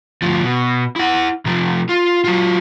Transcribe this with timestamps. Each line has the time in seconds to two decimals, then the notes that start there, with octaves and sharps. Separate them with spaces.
0.22 D2 F3
0.43 B2
0.96 E4 F#5
1.45 C3 F3
1.89 F4
2.24 F#3 F4